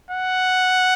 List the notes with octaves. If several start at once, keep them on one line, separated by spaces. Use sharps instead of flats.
F#5